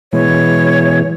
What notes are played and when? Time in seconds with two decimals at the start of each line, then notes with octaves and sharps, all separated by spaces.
0.13 B2 E3 G#3 C#5